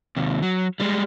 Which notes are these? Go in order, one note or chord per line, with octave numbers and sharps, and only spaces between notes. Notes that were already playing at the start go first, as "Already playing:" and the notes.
D#2 C3
F#3
G3 G#3